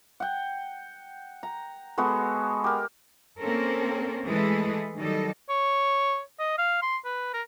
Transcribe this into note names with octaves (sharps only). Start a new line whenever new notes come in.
F#5 G5
A#5
G#3 B3 F#4 A4
G4 A#4
A#3 C4 C#4 A4 A#4
E3 G#3 A3 G#4 A4 B4
D#3 F#3 G3 A4 D#5
C#5
D#5
F5
C6
B4
A#4